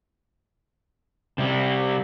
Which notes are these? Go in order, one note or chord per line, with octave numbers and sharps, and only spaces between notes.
C3 G3